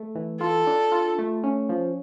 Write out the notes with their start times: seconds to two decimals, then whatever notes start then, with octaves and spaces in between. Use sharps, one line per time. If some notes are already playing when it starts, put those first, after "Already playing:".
Already playing: A3
0.15 E3
0.41 F4 A4
0.67 D4
0.92 F4
1.19 A3
1.43 C#4
1.69 F3